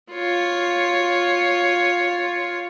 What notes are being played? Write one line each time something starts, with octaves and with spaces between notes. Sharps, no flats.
F4 C#5